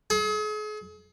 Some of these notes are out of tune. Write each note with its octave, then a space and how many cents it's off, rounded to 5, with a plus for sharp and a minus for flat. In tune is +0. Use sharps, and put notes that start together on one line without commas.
G#4 +40